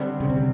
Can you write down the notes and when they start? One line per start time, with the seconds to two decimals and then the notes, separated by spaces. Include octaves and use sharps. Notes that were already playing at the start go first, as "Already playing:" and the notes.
Already playing: D3 G3 C4
0.20 C#3
0.30 C3